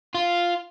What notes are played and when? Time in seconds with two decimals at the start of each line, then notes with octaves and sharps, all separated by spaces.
0.15 F4